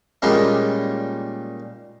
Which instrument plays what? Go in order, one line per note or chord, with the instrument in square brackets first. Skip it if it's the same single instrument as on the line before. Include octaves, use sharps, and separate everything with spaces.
[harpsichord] A#2 D#3 G3 G#3 C#4